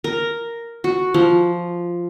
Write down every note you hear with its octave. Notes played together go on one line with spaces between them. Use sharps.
A#4
F#4
F3